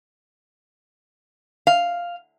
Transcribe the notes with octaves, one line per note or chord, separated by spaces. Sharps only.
F5